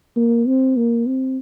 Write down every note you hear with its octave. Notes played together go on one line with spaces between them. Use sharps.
A#3
C4
A#3
C4